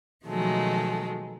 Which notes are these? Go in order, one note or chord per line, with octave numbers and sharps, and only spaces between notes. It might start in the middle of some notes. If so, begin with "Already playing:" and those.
B2 D#3 F3 F#3 G#3 A3